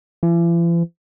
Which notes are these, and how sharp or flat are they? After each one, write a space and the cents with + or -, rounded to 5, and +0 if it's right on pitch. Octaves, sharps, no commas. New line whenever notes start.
E3 +45